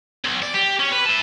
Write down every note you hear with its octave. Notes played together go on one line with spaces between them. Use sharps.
B1
D5
G4
C#4
B4
E4 A5